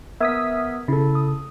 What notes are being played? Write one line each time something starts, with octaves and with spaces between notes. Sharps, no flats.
B3 A#4 E5 D#6 G#6 B6
C#3 E4 A4
D#6